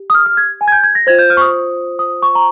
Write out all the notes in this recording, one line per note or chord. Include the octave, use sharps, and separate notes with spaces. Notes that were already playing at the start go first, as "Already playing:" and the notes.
Already playing: G4
D#6
F6
F6
G#6
G#5
G#6
G6
G#6
A#6
F4 C5 G#6
G6
F6
C#6
D#6
D#6
C#6
A#5